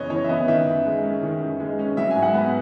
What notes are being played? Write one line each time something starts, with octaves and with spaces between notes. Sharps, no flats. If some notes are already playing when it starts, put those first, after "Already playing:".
Already playing: F#2 C#3 E3 B3 C#5 D#5
E3 C#5
E5
B3 D#5
D#3 E5
F#2
G#3
C#4
D#3
F#2
G#3
C#4
F#3 E5
G#2 G#5
F#5
B3